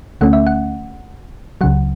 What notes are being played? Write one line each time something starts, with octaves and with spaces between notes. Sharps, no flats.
D2 D3 A3 C#4 F#5
E5
F#5
C#2 C#3 F#3 F#5